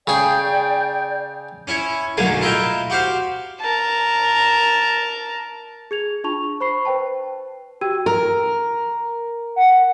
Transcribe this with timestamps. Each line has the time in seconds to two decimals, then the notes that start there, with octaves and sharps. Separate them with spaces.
0.07 C#3 G#4 D5 G5 G6
1.67 C#4 E4 C#5
2.17 B1 F#2 D3 A3 A#3 G#5
2.41 E4 F4 A#4 D#5 E5 G5
2.90 F#4 G4 C5 F5
3.61 A#4 A5
5.91 G#4 G#6 F7
6.24 D4 F4 A5 C#6 F7
6.61 C5 B5 C#6 C7
6.85 B4 C5 G5 A5
7.81 F#4 G4 G5 E6 G#6 D#7
8.06 A#4
9.56 F#5